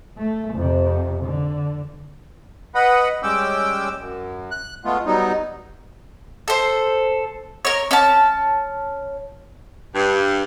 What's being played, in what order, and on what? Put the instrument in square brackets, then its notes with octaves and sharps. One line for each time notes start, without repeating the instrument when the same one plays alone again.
[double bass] A3
F2 C3
D3
[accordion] B4 D#5 F#5 B5
G3 G#3 C#4 G5 D6 E6
F#2
F#6
G#3 A3 B3 F4
F#3 G3 B3 D#4
[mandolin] A4 C5
A#4 C#5
C#4 A5
[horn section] G2